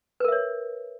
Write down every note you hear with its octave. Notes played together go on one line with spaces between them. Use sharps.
A#4 B4 C#5 E5